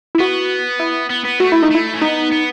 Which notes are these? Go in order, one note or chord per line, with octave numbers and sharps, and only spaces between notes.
E4
B3 F#4
E4
B3
B3
A3 F#4
E4
D#4
A3 E4
C#4
B3 D#4
B3